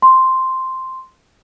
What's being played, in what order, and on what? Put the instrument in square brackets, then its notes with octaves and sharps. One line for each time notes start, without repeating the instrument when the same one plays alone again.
[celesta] C6